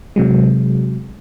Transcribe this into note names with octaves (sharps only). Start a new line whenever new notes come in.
C3 F#3 G#3